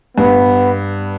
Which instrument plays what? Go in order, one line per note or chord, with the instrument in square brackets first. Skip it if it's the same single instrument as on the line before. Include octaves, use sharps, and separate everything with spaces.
[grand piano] G2 [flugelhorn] B3